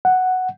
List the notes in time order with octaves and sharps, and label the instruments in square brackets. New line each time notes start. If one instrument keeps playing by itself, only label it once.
[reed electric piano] F#5